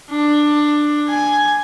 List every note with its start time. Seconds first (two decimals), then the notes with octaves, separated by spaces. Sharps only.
0.10 D4
1.09 G#5